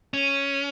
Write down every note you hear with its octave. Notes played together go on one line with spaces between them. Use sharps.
C#4